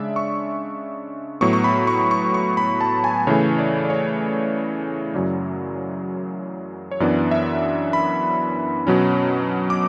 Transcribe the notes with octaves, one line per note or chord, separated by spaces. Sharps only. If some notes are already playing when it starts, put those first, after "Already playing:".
Already playing: C#3 G#3 D4 D5 E5
C#6
A2 F#3 B3 C#6
C#6
B5
C#6
C#6
C#6
B5
A5
G#5
C#3 E3 A3 C#5
D5
D5
C#5
F#2 C#3 F#3 C#4 E4 D5
C#5
F#2 E3 B3 D4 D5
E5
B5
B2 F#3 C#4
D6